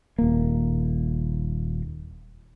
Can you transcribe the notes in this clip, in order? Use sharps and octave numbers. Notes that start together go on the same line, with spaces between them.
D#1 A#3